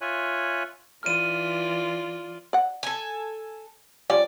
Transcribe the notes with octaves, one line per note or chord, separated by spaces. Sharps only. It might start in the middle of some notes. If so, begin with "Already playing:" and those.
F4 C#5 E5 G#5 F#6
E3 F4 D5 F6 D#7
D5 F#5
A4 G#5
F3 G3 C#4 D5